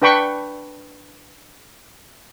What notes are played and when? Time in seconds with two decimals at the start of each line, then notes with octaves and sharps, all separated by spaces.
0.02 D4 B4 G5 B5 C#6